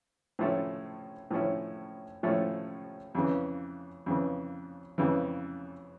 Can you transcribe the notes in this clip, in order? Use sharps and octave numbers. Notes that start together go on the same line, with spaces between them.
A2 F3 A3 C#4 E4
A2 F3 A3 C#4 E4
A2 F3 A3 C#4 E4
F2 C#3 E3
F2 C#3 E3
F2 C#3 E3